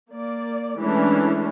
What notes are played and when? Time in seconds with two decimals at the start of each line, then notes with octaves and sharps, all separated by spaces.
0.11 A#3 D5
0.79 E3 G#3 A3 C#4 D4